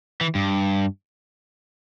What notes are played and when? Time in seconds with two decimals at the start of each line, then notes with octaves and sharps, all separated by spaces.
0.21 E3
0.35 G2